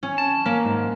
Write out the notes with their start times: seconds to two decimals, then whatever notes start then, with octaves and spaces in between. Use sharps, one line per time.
0.03 C#4
0.18 A5
0.46 A#3 C#4
0.65 G#2